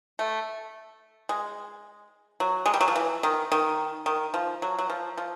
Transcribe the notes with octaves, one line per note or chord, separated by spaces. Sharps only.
A3
G#3
F#3
G#3
G3
F#3
F3
E3
D#3
D#3
D#3
F3
F#3
F#3
F3
F3